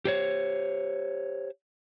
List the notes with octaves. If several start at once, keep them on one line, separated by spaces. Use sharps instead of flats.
G4 C5 C#5